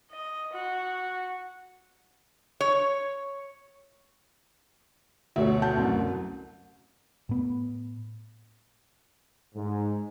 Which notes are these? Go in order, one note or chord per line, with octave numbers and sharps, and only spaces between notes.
D#5
F#4
C#5
D2 B2 C#5 E5
F#5 A5 G6
C2 F#2
A2 B3
G#2